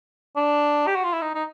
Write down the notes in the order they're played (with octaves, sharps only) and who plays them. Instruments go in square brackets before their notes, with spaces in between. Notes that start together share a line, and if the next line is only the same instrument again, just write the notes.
[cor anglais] D4
G4
F#4
F4
E4
D#4
D#4